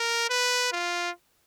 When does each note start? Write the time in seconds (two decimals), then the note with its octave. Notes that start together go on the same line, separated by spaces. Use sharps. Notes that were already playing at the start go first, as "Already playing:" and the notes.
Already playing: A#4
0.30 B4
0.72 F4